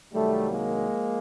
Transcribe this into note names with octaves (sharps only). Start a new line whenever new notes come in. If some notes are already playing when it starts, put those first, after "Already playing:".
C2 C3 D#3 F#3 G3 A3
G#3 A#3
F3